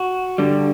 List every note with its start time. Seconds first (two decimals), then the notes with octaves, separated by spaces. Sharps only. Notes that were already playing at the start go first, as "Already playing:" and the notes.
Already playing: F#4
0.38 G2 D3 G3